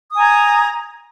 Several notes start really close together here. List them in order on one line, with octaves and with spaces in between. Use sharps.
D#6 G#5 A#5 G#6